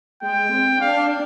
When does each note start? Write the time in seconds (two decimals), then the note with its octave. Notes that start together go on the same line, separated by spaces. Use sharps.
0.22 G#3 G5
0.53 C4
0.81 D4 F5